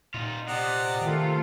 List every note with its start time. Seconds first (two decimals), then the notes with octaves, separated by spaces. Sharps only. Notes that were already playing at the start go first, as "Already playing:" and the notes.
0.14 A#2 D#4 F4
0.48 C3 D5 D#5 F#5
1.01 D#3 A3 F4 A4